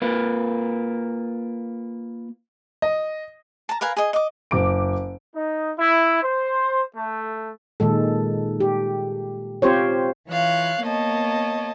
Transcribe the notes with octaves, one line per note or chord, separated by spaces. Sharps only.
A#3 F4 B4
D#5
A5 A#5
A#4 B4 F5 G#5
G#4 D#5
D#5 D6
F#1 D6 D7
D#4
E4
C5
A3
A#2 D#3 G#3 A4
G4
C4 F4 G4 C5 C#5
E3 F4 C#5 F5 F#6
A#3 B3 C#5 D#5 A5